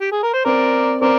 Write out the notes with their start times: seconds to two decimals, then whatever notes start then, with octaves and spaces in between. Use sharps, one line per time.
0.01 G4
0.12 G#4
0.23 A#4
0.33 C5
0.45 C4 A#4 D5
1.01 C4 A#4 D5